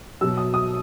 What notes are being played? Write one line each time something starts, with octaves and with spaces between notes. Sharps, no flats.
B2 F#3 E6
D#6
D#6